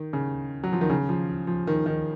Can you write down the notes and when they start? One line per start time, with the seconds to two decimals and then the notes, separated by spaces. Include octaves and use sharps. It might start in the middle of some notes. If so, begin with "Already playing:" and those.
Already playing: D#3
0.13 C#3
0.64 F#3
0.73 F3
0.81 D#3
0.90 C#3
1.09 F3
1.47 F3
1.67 D#3
1.86 D#3